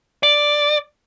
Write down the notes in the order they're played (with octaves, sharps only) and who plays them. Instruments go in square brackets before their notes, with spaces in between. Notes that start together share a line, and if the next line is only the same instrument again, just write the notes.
[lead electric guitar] D5